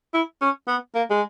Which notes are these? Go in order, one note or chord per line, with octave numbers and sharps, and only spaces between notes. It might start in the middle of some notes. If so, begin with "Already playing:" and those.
E4
C#4
B3
A#3
G#3